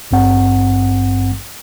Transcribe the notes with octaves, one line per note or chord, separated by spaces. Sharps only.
G#1 G2 C4 F#5